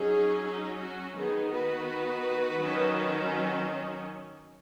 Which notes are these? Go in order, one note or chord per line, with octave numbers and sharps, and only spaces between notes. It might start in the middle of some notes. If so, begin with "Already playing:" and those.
Already playing: F#3 C#4 D#4 G#4
D#4
F#4
D#3 B3 D#4 G#4
F#4 B4
D#3 F#3 C#4